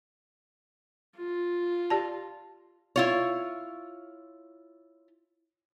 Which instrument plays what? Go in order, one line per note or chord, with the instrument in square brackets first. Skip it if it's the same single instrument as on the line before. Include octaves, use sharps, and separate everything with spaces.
[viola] F4
[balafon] G4 D5 A5
[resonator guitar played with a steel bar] E4 F4 C#5